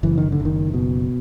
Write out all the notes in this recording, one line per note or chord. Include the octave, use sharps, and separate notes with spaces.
F#1 E3
D#3
D3
F#1
D#3
B2